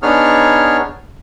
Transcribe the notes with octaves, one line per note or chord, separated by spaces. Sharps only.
B3 D4 D#4 G#4 C#5 F6